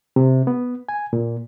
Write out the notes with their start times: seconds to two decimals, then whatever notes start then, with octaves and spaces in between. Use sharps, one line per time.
0.16 C3
0.47 B3
0.89 G#5
1.13 A#2